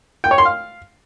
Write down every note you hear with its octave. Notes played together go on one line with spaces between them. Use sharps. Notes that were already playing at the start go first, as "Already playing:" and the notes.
G5
C#5
C6
F5